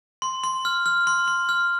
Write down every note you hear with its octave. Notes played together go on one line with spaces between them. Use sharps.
C6
C6
F6
F6
C6
C6
F6